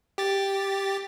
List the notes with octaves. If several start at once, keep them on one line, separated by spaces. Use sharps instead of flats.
G4 A6